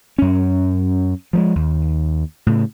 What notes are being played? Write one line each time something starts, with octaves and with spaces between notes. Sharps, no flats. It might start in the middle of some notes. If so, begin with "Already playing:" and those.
F#2 C#4
F3 F#3 G#3
D#2
A2 C#3